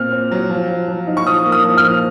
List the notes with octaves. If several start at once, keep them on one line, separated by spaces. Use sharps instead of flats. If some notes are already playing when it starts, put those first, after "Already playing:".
Already playing: A#2 C4 F6
C4
F#3
F3
F3
F3
D#4
C#6
F3 D#6
A#3
D#6
F3
F6
F3